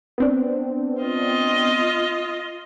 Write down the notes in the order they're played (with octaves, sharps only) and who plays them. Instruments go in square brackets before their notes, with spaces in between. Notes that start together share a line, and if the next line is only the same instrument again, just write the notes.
[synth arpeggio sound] B3 C4 D4
[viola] F4 D#5